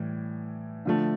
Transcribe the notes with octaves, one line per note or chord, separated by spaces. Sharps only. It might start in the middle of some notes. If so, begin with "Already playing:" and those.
Already playing: A2 E3 G3
D3 F3 A3